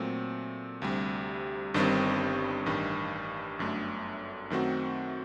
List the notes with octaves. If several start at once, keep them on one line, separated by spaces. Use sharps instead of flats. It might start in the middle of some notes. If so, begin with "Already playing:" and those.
Already playing: A#2 F#3 A3 C4
D2 C3 G3
G1 G2 D#3 G3 C4
A1 G2 D#3
G1 F#2 D3 A3
F#2 D#3 A3 C4 F#4